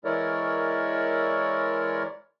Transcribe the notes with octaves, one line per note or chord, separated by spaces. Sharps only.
E3 G#3 E4 A#4 C#5 D5